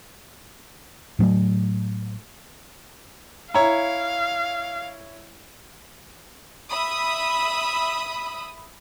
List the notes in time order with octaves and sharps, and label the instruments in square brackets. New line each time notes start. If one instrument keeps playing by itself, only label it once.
[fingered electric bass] A2 F#3 A3
[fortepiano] E4 C#5 [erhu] F5 [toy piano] G5 A#5
[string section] E5 B5 D#6